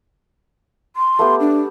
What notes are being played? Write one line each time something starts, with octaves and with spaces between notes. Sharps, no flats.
C6
A3 B3 G4
D4